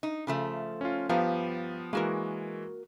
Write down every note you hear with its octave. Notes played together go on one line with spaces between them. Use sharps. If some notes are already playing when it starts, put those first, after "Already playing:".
D#4
C#3 F3 A3
C#4 F4
G2 F3 B3 G4 F5 A#5
E3 G#3 A#3 F#4 A#4